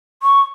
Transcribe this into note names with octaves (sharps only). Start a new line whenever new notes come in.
C#6